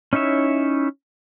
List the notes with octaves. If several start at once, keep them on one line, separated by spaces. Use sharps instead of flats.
C#4 D#4 E4 C#5 E5